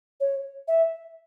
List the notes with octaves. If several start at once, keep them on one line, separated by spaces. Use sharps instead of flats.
C#5
E5